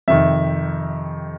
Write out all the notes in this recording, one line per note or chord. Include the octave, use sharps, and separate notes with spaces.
F2 C3 D#3 E5